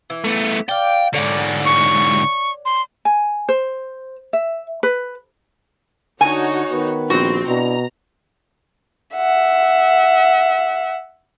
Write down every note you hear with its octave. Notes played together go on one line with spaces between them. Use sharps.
E3
A3 B3
D5 F5 G5
G#2 D3 C#5 D5 F#5
C#6
C6
G#5
C5
E5
B4
D3 D#4 F#4 C#5 F#5 G#5
D#3 B3 B4
A#1 C4 F#4
B2 D4 E4 A#5
E5 F#5